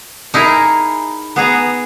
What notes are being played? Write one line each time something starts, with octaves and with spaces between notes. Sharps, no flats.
D#4 E4 G#4 A#4
B3 G#4 A#5